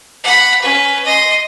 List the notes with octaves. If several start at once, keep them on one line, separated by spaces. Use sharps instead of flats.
F#5 B5
C#4 B4
D#5 C6